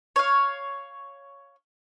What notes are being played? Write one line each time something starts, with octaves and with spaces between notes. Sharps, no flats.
C#5 F5